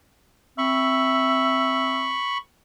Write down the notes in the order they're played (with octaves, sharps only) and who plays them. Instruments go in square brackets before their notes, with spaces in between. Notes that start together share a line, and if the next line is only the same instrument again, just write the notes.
[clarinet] C4 [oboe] E5 [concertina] B5 C#6